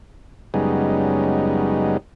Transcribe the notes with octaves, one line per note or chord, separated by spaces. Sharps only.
F#2 C#3 G3 G#3 B3 D#4